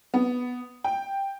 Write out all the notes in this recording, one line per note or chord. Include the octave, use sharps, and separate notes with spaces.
B3
G5